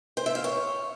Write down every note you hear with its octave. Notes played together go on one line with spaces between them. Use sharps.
C5
E5
F5
C#5